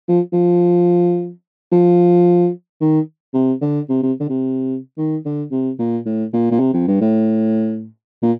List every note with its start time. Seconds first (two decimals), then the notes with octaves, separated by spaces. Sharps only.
0.08 F3
0.33 F3
1.72 F3
2.81 D#3
3.34 C3
3.62 D3
3.89 C3
4.03 C3
4.20 D3
4.29 C3
4.98 D#3
5.25 D3
5.51 C3
5.79 A#2
6.06 A2
6.33 A#2
6.51 A#2
6.60 C3
6.73 F2
6.87 G2
7.01 A2
8.22 A#2